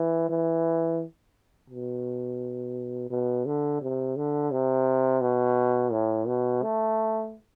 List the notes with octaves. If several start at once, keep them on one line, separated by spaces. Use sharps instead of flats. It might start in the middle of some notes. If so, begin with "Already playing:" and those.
Already playing: E3
E3
B2
B2
D3
C3
D3
C3
B2
A2
B2
A3